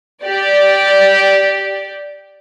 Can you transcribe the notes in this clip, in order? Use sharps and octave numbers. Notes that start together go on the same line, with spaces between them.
G4 D5